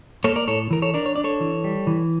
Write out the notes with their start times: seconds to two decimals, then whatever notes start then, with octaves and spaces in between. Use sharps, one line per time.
0.24 A#3 A4 C#5
0.36 A#4 D5
0.48 A2 A4 C#5
0.71 E3 A#4
0.82 A4 C#5
0.94 D4 A#4 D5
1.06 C#5
1.16 D4 D5
1.24 A4 C#5
1.40 E3
1.64 G3
1.87 E3